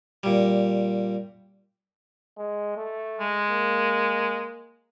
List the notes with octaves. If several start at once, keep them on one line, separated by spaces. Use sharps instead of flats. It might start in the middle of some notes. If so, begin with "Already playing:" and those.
A#2 G3
G#3
A3
G#3
A#3